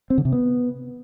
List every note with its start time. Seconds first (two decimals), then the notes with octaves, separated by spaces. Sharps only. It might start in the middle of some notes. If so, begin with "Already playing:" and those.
0.10 C4
0.18 D3
0.25 C3
0.32 B3